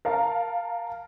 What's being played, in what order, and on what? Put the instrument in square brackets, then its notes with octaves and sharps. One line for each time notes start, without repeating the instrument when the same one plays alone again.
[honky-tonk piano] A#4 F5 A5